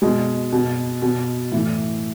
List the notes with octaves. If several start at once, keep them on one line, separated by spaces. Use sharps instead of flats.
B2 G#3
B2
B2
A2 E3